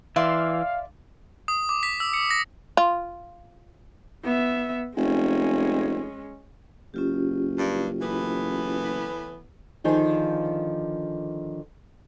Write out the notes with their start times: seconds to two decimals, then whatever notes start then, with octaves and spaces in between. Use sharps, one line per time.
0.16 E3 D5 E5 F5 C6
1.48 D#6
1.69 D6
1.83 B6
2.00 E6
2.14 C#7
2.31 A#6
2.77 F4
4.24 B3 E5
4.96 F1 G#3 C#4
6.94 F#1 C#4 F4 G4
7.58 G2
8.01 A2 E3 B3
9.84 D3 D#3 F3 G#4